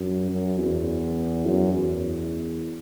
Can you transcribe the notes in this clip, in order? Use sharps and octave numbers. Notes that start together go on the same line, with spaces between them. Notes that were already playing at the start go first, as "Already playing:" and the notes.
Already playing: F#2
F#2
E2
F#2
E2